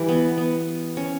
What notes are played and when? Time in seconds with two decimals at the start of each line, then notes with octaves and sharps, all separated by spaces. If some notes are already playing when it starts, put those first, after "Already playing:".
Already playing: E3 G3
0.08 B3
0.37 B3
0.97 C#4